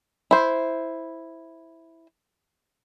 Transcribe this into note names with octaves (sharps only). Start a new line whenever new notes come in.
E4 C5